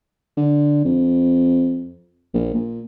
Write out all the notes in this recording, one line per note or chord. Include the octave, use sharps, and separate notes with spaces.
D3
F2
A#1
A#2